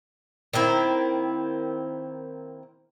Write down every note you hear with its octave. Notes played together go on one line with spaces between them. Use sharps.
D#3 A#3 C4 E4